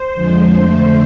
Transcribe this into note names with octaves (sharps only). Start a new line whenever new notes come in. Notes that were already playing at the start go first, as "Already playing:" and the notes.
Already playing: C5
F2 D3 F3 G#3
F2 D3 A3